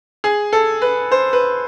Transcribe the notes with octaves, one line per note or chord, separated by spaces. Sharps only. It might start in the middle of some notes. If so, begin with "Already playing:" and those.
G#4
A4
B4
C5
B4